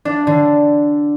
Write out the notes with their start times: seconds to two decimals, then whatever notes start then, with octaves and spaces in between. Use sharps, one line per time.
0.05 D4
0.27 D3